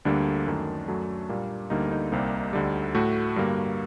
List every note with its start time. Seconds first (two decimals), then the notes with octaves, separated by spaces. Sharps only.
0.05 D2 D3 G3 A#3 D4
0.47 F#2 D#3 A3
0.88 F#2 F#3 A3
1.29 A#2 G3 A#3
1.70 D2 D3 G3 A#3 D#4
1.92 D#4
2.12 C2 C3 G3 A#3
2.53 D2 D3 G3
2.95 A2 A3 F#4
3.36 G2 D3 G3 A#3